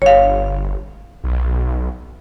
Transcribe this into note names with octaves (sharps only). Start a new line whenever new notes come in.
G1 C#5 F5
B1